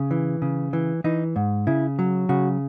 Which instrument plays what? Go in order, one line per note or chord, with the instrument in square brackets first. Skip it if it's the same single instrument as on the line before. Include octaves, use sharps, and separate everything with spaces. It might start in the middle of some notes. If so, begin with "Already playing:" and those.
Already playing: [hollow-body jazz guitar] C#3
E3
C#3
E3
E3 D#4
G#2
C#3 E4
F#3
C#3 F#4